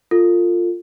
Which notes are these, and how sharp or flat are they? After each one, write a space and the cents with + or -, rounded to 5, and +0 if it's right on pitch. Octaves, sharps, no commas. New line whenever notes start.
F4 +0 A4 +35